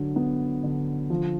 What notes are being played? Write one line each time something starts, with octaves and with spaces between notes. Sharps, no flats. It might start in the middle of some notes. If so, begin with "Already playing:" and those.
Already playing: D3 F#3
B3
D3
F3